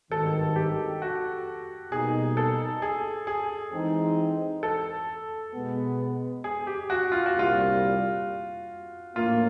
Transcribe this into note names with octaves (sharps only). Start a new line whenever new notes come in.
G#1 G2 D#3 A4
G4
F#4
B2 G3 A#3 D#4 G#4
A4
G#4
G#4
E3 G#3 C4 D#4
A4
B2 G#3 B3
G#4
G4
F#4
F4
F#4
C2 A#2 G3 F4
A#1 A2 F#3 A#3 F4